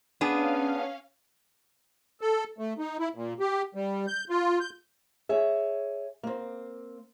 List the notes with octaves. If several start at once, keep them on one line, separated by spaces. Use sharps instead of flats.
B3 C#4 D4 G#4 F5
A4
A3
D#4
E4
A#2
G4
G3
G6
F4
G6
G#4 C#5 E5
A#3 C4